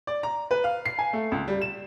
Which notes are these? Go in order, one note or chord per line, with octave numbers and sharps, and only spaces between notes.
D5
A#5
B4
F5
C7
G#5
A3
C#2
G3
E7